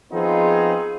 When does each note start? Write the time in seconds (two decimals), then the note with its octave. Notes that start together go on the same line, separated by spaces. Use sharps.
0.12 F3 B3 C4 D#4 F4 G#4